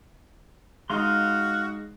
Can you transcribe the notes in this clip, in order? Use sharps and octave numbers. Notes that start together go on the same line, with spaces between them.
G#3 D#4 F#4 D#5 F5 C6